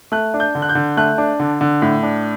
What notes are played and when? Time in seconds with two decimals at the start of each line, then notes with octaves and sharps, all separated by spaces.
0.12 A3 F#6
0.34 D4
0.40 G6
0.55 D3
0.62 F#6
0.69 G6
0.75 D3
0.97 A3 F#6
1.18 D4
1.40 D3
1.61 D3
1.82 A2
2.03 D4